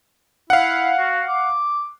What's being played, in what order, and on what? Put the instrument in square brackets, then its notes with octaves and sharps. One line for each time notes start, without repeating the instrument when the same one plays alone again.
[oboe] E4 [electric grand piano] F5 F#5
[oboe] F#4
D6